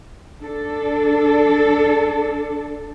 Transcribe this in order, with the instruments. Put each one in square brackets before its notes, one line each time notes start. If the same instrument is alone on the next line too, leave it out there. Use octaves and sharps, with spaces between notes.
[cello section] D4 A4